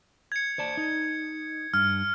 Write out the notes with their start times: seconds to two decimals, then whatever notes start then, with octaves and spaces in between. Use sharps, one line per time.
0.32 G#6 C#7
0.58 C5 D5 A5
0.77 D#4
1.74 G2 F6